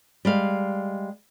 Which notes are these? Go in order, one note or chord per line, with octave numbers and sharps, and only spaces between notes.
G3 G#3 F5